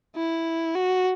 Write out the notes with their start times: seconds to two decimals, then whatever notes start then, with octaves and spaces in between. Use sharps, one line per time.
0.16 E4
0.75 F#4